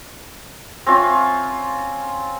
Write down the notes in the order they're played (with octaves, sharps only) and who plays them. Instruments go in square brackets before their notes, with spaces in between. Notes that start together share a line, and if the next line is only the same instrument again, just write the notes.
[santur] C4 C#4 F4